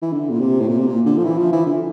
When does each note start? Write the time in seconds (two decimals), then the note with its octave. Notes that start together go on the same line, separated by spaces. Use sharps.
0.02 E3
0.13 D3
0.30 A#2
0.40 C3
0.61 A2
0.68 A#2
0.79 C3
0.87 A#2
1.06 D3
1.18 F3
1.25 E3
1.38 F3
1.52 E3
1.66 D3